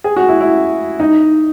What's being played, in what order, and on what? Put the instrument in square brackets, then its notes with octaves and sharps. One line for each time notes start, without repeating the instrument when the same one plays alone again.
[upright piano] G#4
F#4
E4
E4
D#4